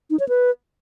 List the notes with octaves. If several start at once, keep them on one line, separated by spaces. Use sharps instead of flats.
D#4
C#5
B4